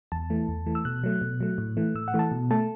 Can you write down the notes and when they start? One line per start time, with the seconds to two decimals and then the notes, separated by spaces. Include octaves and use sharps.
0.12 E2 A5
0.30 E3 A3
0.48 E2
0.66 E3 A3
0.75 E6
0.85 B2 F#6
1.04 F#3 A3
1.21 B2
1.41 F#3 A3
1.58 A2
1.77 E3 A3
1.95 A2 E6
2.08 F#5
2.14 E3 A3
2.19 A5
2.31 B2
2.51 A3 A5